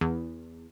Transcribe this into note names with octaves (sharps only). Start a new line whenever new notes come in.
E2